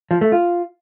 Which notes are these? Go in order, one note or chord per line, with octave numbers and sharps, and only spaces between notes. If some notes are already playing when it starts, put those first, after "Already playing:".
F3
A3
F4